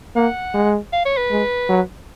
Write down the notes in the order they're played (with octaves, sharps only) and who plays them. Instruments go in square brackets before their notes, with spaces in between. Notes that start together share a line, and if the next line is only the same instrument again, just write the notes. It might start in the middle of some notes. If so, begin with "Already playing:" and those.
[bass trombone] A#3 [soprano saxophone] F#5
[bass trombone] G#3
[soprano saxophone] F5
C#5
B4
[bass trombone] G#3
F#3